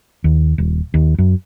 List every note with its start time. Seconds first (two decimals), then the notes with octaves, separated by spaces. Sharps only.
0.24 D#2
0.58 D#1
0.94 D#2
1.18 F#2